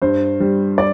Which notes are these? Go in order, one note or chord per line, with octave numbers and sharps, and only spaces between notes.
G2 C5
G3
D5